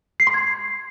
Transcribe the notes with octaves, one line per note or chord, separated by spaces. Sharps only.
C7
C6
G#6